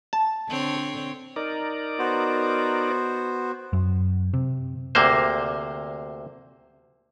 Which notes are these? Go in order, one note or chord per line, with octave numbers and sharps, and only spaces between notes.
A5
D3 C4 C#5
D#4 A#4 D5
B3 F#4 C5
F#2
C3
D2 C3 A#3 C5